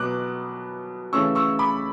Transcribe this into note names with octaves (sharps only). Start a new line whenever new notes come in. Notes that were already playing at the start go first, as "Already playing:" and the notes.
Already playing: B2 F#3 B3 D6 F#6
C#3 E3 A3 C#4 C#6 E6
C#6 E6
B5 D6